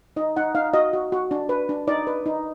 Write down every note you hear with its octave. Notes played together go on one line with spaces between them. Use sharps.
D#4 D#5
D#4 F#5
D#4 F5
F#4 D#5
F#4
F#4
D4
B4
D4
D#4 D5
B4
D#4